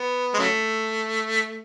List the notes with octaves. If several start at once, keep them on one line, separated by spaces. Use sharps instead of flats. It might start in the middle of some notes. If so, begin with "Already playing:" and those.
Already playing: B3
G#3
C#3 F#3 A3